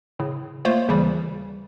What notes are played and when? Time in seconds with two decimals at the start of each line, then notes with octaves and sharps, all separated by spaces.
0.19 A2 C#3
0.65 A3 A#3 F4 C5 C#5 F5
0.88 G#1 D#2 C#3 E3 G3